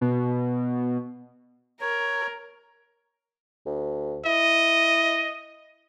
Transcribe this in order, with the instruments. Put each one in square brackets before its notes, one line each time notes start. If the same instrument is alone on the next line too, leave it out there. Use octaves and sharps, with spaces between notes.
[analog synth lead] B2
[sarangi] A#4 [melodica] C#5
[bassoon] D2
[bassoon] E4 [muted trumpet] D#5